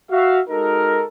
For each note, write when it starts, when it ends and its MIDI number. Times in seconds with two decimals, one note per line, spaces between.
0.11 0.40 66
0.11 0.40 76
0.11 0.40 77
0.49 1.05 56
0.49 1.05 63
0.49 1.05 66
0.49 1.05 69
0.49 1.05 70